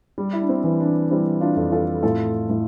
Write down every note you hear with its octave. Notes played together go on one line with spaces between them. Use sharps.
G3
E4
D4
C4
E3
D4
G3 C4 E4
D4 F4
F2
F4 A4
A2 F4 A4
A2